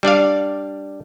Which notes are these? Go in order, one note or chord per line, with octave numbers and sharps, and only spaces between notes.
G3 D4 D5 F5